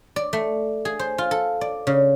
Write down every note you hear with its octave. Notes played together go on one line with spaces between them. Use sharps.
D5
A3
G#4
C5
F4
A4
D5
C#3